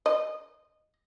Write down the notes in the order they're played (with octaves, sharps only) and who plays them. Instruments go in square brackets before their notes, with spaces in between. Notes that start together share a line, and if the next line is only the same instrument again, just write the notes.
[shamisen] D#5